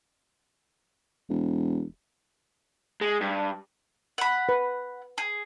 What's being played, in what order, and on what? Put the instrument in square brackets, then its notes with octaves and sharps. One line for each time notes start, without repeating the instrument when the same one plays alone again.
[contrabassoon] E1
[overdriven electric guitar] G#3
G2
[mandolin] F#5 B5
[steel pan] B4
[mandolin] G#4